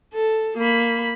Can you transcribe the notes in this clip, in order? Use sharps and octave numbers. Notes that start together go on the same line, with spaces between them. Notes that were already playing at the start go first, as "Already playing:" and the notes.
A4
A#3 B5